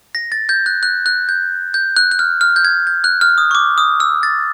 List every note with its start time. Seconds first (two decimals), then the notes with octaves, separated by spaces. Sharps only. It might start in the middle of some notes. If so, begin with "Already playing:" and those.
0.15 A#6
0.32 A6
0.49 G6
0.66 F#6
0.83 F#6
1.06 F#6
1.29 G6
1.74 G6
1.96 F#6
2.12 F#6
2.19 F6
2.41 F6
2.56 G6
2.65 G#6
2.87 G6
3.04 F#6
3.21 F6
3.38 D#6
3.51 C#6
3.55 D6
3.78 D#6
4.00 E6
4.23 A6